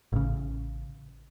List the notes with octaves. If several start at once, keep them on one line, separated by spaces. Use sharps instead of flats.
A1 C#3